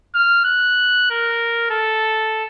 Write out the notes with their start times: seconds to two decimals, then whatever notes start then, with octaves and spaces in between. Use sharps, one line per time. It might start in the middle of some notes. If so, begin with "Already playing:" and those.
0.15 F6
0.45 F#6
1.11 A#4
1.71 A4